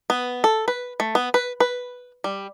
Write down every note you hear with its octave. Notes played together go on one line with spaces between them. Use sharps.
B3
A4
B4
A3
B3
B4
B4
G3